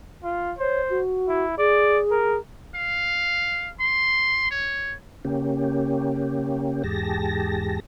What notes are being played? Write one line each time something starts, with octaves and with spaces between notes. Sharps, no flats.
F4
C5 C#5
F#4
E4
G#4 D5
A#4
F5
C6
C#5
C#3 A#3 C#4 G4
E2 G#2 G4 G#4 A5 A#6